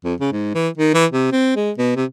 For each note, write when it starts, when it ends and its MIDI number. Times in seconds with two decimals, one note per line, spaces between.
0.04 0.14 41
0.20 0.30 49
0.32 0.53 44
0.55 0.69 52
0.78 0.92 51
0.94 1.06 52
1.12 1.30 48
1.32 1.53 60
1.56 1.71 56
1.78 1.97 47
1.97 2.05 48